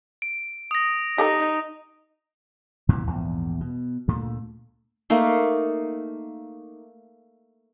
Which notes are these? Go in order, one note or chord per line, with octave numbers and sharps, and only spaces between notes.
D7
D#6 A#6
D#4 G4 A4 A#5
E2 A#2 C#3 E3
A#1 E2 G#2
B2
D2 A#2 A3
A3 A#3 D#4